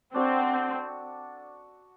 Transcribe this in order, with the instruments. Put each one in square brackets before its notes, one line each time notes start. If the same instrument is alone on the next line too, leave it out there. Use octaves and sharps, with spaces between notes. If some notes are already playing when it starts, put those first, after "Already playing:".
[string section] C4 [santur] D4 F#4 A4